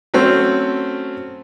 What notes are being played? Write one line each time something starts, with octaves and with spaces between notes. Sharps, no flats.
F#3 A3 C4 C#4